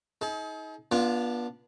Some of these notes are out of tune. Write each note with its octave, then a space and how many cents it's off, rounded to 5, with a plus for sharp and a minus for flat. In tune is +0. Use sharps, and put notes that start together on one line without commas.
D#4 +35 G#4 +45
B3 -35 D4 +0 F4 +0